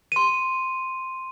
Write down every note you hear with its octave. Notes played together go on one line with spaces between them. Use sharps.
C6 D#7